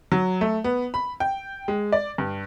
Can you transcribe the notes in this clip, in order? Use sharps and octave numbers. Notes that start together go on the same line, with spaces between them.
F#3
A3
B3
B5
G5
G#3
D5
G2